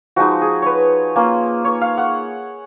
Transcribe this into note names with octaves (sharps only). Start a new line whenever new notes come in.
F3 G#3 D#4 F#4
G#4
B4 C#5
A#3 C#4 F4
C#5
F5
F#5